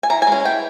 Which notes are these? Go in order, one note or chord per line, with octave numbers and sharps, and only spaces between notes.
G#5
E3 A#5
G#5
G#3 C#4
E3 G5